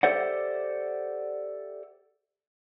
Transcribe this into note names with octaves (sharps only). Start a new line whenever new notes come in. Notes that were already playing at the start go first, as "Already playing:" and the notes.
G4 A4 C5 D5 E5 F#5